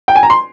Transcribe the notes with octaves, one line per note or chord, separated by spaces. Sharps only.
G5
G#5
A#5
C6